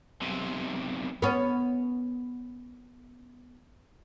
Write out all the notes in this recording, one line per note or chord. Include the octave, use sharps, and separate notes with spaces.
B1 C3
B3 C#4